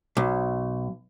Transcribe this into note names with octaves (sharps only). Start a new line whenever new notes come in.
B1